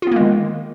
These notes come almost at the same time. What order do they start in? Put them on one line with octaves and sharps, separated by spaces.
F4 B3 A#3 G#3 D#3